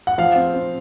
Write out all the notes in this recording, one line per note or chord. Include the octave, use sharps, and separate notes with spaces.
F#5
F3 F5
C4
C4